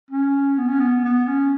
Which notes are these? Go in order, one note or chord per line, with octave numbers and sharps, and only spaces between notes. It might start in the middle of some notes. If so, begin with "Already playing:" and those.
C#4
B3
C#4
B3
B3
C#4